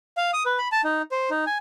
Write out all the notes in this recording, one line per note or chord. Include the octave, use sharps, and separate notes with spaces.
F5
D#6
B4
B5
A5
D#4
C5
D#4
G#5